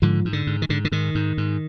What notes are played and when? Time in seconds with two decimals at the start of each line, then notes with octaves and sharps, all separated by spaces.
0.02 G#2 D3 F3
0.25 G#2
0.33 D3
0.47 G#2
0.62 D#3
0.69 G#2 D3
0.85 D3
0.92 G#2 D#3
1.15 G#2
1.38 G#2